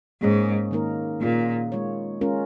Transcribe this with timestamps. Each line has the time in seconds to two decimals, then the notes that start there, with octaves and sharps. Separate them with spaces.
0.21 G#2 A#3 C#4 G#4 C#5
0.71 D#3 A#3 D#4 A#4
1.21 A#2 A#3 C#4 F4 G#4
1.72 G#3 F4 C#5
2.21 G#3 C#4 F4 A#4